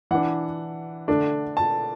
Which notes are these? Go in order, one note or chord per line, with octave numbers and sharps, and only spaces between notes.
E3 D4 F#5
D3 A3 D4
A5